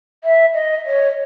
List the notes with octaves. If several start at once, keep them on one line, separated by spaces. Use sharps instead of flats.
E5
D#5
C#5